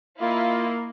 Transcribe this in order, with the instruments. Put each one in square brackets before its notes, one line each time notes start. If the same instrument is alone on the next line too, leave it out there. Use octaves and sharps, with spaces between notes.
[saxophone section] A#3 [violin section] E4 D#5 F5 [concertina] F4